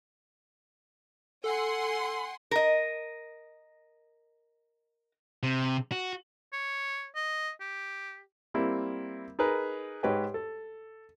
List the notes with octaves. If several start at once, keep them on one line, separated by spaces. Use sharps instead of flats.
A4 F#5 G#5 C6
A#4 D#5
C3
F#4
C#5
D#5
G4
G3 A#3 C4 E4
D#4 G#4 A#4 B4
G#2 G4 B4 C#5 D#5 G5
A4